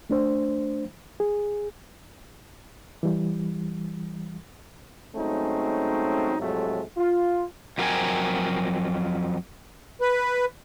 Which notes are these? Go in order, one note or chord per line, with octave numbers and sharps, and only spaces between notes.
A3 D4 C5
G#4
E3 G3
F#3 G#3 A3 C4 C#4 D#4
F2 A2 C3 F#3 G#3 A3
F4
F2 F#3 A#4 C5 G5 G#5
B4